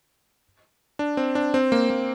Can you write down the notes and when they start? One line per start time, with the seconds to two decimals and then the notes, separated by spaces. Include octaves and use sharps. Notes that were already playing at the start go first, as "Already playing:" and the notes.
0.99 D4
1.17 C4
1.35 D4
1.54 C4
1.72 A#3
1.90 A#3